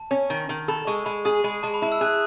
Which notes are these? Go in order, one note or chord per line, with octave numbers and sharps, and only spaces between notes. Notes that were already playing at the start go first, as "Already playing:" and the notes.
Already playing: A5
C#4
D#3
D#3
A4 B5
G#3 C#6
G#3 B5
G#4 D#6
G#3 B5
G#3 A5
B5
E4 A5
E6
G#4 F#6